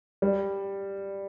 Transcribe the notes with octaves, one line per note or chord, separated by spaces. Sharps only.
G3